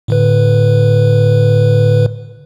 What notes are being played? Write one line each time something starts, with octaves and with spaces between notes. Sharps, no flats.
A2 D3 B4